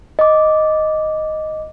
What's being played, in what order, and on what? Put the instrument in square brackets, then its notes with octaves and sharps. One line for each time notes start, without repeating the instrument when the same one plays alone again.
[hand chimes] D#5 D6